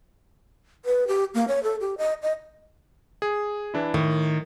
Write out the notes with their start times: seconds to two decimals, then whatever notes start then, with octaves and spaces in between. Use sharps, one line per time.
0.85 B4
1.08 G4
1.34 A#3
1.48 C#5
1.63 A4
1.81 G4
1.98 D#5
2.22 D#5
3.22 G#4
3.74 E3 D4 E4
3.94 A2 D#3